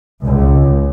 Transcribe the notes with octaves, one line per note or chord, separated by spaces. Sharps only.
C#2